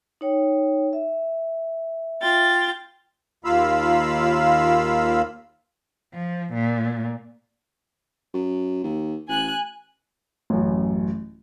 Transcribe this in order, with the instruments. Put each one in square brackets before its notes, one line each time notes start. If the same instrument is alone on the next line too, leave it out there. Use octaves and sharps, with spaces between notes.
[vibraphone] D#4 C#5 G5
E5
[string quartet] F4 G5 A6
[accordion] D#2 A#3 F4 F5 B5 E6
[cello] F3
A#2
[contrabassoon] F#2
D#2
[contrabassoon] A1 [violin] G#5 F#6
[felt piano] A1 F#2